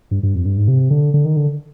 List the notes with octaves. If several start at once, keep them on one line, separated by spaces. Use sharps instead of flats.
G2
G2
F2
G2
G#2
C3
D3
D3
D#3
D3